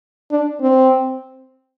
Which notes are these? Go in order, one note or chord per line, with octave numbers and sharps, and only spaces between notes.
D4
C4